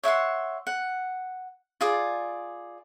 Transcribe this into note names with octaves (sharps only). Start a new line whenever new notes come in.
C#5 E5 F#5 C6
F#5
F4 G#4 D5